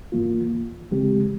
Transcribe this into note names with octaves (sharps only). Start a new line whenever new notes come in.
G#2 E3 A#3 F4
C#3 E3 G#3 C4 G4